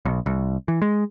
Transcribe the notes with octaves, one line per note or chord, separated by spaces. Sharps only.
B1
C2
E3
G#3